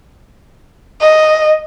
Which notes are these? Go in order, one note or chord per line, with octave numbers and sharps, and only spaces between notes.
D#5